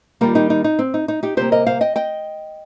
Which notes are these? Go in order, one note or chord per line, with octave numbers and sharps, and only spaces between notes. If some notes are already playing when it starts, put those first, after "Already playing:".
D#3 G3 A#3 F4 A#4
D#4 G4
D#4
D#4
C4
D#4
D#4
D#4 G4
C3 G3 A#3 G4 C5
A#4 D#5
C5 F5
D#5 G5
D#5 G5